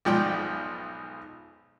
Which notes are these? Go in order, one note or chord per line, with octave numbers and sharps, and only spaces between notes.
B1 G#2 F3 D5 G5